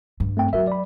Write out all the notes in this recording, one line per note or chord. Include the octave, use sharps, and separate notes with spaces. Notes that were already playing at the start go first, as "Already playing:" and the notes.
G2
A3 C4 G5
F#3 F#4 A#4 E5
D5 B5